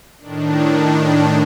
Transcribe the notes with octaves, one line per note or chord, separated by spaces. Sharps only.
A2 D#3 D4